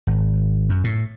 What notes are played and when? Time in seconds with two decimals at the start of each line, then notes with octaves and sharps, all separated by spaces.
0.07 G#1
0.69 F#2
0.84 A2